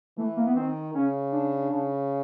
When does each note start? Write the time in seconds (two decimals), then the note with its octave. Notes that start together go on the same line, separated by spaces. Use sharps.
0.18 E3 A3
0.37 A#3
0.47 B3
0.56 D#3 C4
0.95 C#3 C#4
1.33 D4
1.71 C#3